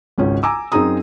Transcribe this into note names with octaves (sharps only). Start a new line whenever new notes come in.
G#1 C#2 C#4
G#5 A#5 D6 E6
F#2 C4 D#4 G#4 A#5 D#6